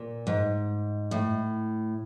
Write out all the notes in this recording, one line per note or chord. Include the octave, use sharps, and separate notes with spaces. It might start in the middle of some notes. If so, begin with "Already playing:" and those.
Already playing: A#2
G#2
A2